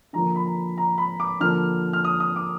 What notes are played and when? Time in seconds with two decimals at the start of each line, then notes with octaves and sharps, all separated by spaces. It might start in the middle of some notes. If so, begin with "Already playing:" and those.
0.13 D3 F3 A#3 A#5
0.36 B5
0.46 A#5
0.78 A#5
0.98 B5
1.20 D6
1.40 D3 F3 A#3 F6
1.93 F6
2.04 D#6
2.20 D#6
2.36 D6